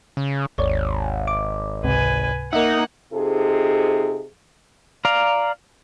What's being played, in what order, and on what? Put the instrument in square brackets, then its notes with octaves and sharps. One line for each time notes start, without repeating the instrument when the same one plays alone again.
[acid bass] C#3
[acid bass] G#1 [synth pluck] D#2 C#5 D5
[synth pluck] D6
[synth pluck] C#2 G#2 C3 [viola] B4 G#5
[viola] A#3 F#5 [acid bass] D#4 [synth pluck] A#4 D#5 E5
[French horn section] C3 D#4 F4 G#4 A4
[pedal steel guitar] D5 F5 A#5